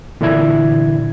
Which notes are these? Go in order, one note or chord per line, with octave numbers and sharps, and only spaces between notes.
A#2 D3 E3 D4 E4 G#6